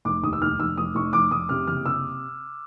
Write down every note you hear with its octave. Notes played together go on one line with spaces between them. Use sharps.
F1 D6
D#2 D#6
E6
F1 F6
F1 E6
F1 D#6
F1 C#6
F1 D6
F1 D#6
C3 F6
F#1 F6
C3 E6